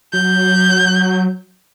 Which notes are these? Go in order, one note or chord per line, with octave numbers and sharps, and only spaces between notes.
F#3 G6